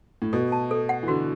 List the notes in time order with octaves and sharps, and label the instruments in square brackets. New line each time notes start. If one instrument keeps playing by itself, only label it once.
[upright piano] A2
[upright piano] B2 [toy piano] A4
[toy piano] A5
A4
F#5
[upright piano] E3
[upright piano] D3 [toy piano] F#4